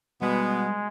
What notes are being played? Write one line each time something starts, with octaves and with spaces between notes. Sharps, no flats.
B2 G3 G#3 B3